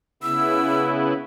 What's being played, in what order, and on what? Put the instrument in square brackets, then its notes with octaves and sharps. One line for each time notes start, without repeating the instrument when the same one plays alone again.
[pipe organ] C#3 B3 E4 [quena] E6